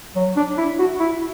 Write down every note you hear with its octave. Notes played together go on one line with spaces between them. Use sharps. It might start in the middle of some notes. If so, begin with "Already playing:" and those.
F#3
D4
E4
F#4
E4